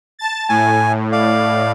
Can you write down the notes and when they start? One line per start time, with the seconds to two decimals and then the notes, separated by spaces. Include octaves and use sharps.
0.19 A5 A6
0.49 A2 G#5
1.12 D5 F5